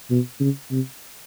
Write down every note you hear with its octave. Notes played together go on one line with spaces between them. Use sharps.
B2
C#3
C3